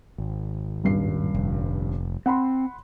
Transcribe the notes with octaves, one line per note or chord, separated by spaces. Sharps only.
G#1
D#1 G2 C7
F1
C4 F#5 B5 C6